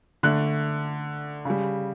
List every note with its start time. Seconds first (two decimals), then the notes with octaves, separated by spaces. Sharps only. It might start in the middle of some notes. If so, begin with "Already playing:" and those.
0.23 D3 A3 F#6
1.45 C#3 G3